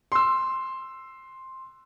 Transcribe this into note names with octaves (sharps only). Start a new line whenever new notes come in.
C6 E6